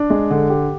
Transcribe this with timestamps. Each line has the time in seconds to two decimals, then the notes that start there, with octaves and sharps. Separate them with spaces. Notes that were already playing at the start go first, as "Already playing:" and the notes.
Already playing: D4
0.10 G#3
0.30 D3
0.50 G4